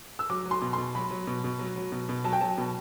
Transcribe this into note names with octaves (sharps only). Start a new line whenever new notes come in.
E6
F#3 D6
F#3
C6
B2
B2 C6
F#3 B5
F#3
B2
B2
F#3
F#3
B2
B2
F#3 A5
G5
F#3 A5
B2